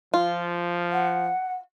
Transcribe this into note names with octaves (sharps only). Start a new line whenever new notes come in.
F3 F4
F#5